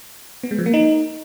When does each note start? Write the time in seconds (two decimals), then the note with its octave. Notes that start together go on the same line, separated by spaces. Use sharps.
0.43 B3
0.51 G#3
0.58 F3
0.66 A#3
0.74 D#4